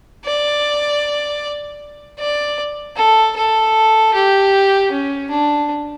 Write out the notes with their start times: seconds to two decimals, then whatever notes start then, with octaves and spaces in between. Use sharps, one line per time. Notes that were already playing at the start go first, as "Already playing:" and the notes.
0.25 D5
2.19 D5
2.96 A4
3.36 A4
4.14 G4
4.91 C#4
5.30 D4